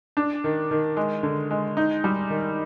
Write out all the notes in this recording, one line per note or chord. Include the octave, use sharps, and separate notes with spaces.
D4
D#3
D#3
G#3
D3
G#3
D#4
G3
D#3